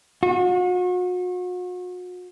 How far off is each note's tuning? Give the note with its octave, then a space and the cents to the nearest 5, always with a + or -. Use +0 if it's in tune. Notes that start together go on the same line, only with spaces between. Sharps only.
F#4 -40